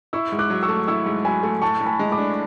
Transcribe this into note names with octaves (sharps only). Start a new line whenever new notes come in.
E4 C#6 E6
G#2
D6 F#6
F#3
C#6 E6
A3
E4 C#6 E6
G#2
F#3 G#5 B5
A3
A2 A5 C#6
A2
G#5 B5
G#3
B5 D6
D4